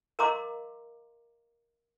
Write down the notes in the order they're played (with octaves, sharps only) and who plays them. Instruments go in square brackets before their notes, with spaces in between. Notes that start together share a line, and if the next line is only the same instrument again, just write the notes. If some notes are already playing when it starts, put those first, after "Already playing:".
[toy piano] A#4 D#5 F5 A#5 C6 D6